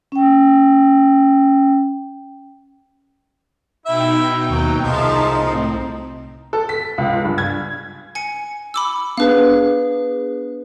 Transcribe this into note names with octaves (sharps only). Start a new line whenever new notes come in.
C#4 G5
B2 D#4 E4 E5 G5
D#2 F#3
C2 F3 G#3 D#4 E5 F5 A5
A2 C4
A4
B6
C#2
G2
G#6
G#5 C#7
B5 D6 E6
B3 D4 G#4 B4 F5